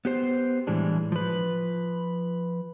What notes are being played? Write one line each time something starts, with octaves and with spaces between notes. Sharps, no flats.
B3 G4 C5
A2 E3 G3 G#3 D4
F3 B4